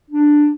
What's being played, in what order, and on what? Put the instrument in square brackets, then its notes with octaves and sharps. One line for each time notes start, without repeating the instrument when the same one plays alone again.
[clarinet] D4